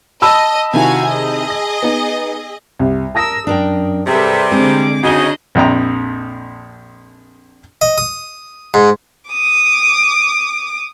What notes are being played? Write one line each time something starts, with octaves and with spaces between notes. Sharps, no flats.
D#5 A5 B5 E6
C3 D#3 E4 F#4 F5 G#5
G#4 D#5
A#6
B3 D#4
C2
A#4 A5 D#6 E6 A#6
F#2 D4 A#4 G5
C3 G3 G#4 A4 B4 E5
D3 G#3 C4 G#4 C5 D6
C#3 D4 D#4 F#4 D#5 G7
A#1 F2 G5 A#5
D#5
D#6
G#2
D6 D#6